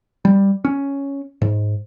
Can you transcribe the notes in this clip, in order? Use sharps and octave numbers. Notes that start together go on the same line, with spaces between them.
G3
C#4
G#2